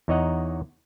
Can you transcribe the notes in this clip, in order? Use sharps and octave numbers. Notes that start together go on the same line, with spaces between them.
E2 D#4 C#5 D#5 F#5 A#5